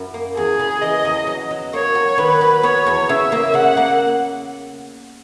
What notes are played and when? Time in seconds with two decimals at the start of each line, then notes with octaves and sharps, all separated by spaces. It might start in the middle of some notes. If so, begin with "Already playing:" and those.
Already playing: F#2 E4
0.14 A#3
0.36 E2 G#4
0.59 C#3
0.82 E3 D#5
1.05 E2
1.27 F#3
1.51 F#3
1.73 A#3 C#5
1.95 F#3
2.18 D#3 B4
2.41 F#3
2.63 B3 C#5
2.87 E2
3.09 C#3 E5
3.32 A#3
3.54 C#3 F#5
3.77 A#3